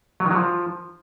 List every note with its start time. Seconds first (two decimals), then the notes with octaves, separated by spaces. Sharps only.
0.20 F#3
0.25 D#3
0.31 F#3
0.36 F3